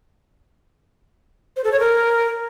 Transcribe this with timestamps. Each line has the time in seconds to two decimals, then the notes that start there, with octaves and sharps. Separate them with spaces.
1.56 C5
1.64 A4
1.72 C#5
1.80 A#4